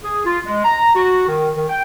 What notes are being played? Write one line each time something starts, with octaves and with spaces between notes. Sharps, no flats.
G#4
F4
G#3
A#5
F#4
D#3
D#3
G5